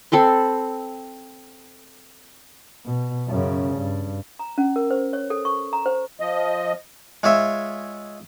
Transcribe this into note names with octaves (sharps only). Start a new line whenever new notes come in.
C4 A4 B5 C6
B2
F#2 C#3
G2
A#5
C#4
A#4
C5
C#5
A4
C#6
A#5
C5
F3 D#5
G#3 F4 C#5 E5